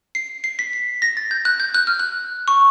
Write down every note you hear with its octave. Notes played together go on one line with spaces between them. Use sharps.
C7
C7
B6
B6
A#6
A6
G6
F#6
G6
F#6
F6
F#6
C#6